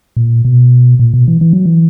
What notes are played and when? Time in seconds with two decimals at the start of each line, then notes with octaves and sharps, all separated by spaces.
0.17 A#2
0.45 B2
0.99 A#2
1.14 B2
1.28 E3
1.41 E3
1.53 F#3
1.65 E3